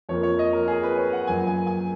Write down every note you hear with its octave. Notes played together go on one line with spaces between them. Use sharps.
F2 F3 A#3 C#5
C#5
D#5
A#4
G#4
B4
C#5
F#5
F#2 F3 A#3 G#5
G#5
G#5